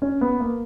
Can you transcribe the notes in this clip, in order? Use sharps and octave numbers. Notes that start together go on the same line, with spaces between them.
C#4
B3
A#3